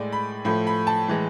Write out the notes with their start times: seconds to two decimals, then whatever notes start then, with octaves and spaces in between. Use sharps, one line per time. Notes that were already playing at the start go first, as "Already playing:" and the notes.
Already playing: A2 G#3 D5
0.13 B5
0.45 A2 F3 A3 B5
0.67 B5
0.87 A5
1.08 A2 E3 G#3